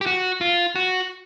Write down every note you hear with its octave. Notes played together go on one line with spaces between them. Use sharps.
G4
F#4
F4
F#4